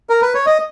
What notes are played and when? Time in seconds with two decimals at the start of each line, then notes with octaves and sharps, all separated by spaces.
0.09 A#4
0.22 B4
0.34 C#5
0.46 D#5